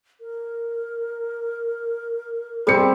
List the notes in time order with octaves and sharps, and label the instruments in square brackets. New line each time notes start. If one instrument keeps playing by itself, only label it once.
[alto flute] A#4
[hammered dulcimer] G3 C4 [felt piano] G#4 C#7